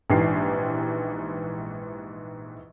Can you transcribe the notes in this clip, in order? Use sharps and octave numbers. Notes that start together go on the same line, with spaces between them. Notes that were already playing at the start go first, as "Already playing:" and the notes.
A#1 G#2 E3 G4 C7